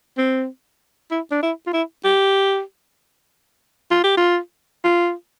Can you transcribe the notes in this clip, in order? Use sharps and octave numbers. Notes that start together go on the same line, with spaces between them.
C4
E4
D4
E4
F4
E4
G4
F4
G4
F4
F4